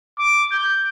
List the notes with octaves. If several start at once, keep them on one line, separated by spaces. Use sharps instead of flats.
D6
G6